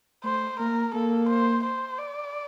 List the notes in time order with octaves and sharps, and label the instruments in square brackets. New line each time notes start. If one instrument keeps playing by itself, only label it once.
[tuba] A3 [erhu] C5
[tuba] A#3 [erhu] A#4
[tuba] A#3 [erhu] A4
[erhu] C5
C5
D5